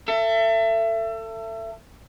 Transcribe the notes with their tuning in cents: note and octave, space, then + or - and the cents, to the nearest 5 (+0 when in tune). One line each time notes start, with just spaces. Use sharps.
A4 +30 E5 +30